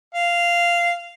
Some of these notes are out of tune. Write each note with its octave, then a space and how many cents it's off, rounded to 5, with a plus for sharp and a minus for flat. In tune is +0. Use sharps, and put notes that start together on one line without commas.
F5 -10